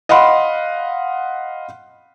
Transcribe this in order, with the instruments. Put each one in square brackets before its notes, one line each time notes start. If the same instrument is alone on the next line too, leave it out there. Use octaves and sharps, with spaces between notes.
[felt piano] D#5 F5 F#5 B5 C6